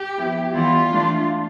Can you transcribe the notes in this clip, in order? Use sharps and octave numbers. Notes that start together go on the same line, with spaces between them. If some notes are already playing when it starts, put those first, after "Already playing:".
Already playing: G4
F3 B3 E4
E3 G3 B3 E4 F4
E3 A3 D4